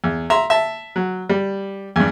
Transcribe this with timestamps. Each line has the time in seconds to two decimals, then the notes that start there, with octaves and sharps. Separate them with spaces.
0.04 E2
0.30 E5 A#5 C6
0.50 E5 A5
0.96 F#3
1.30 G3
1.96 E2 G2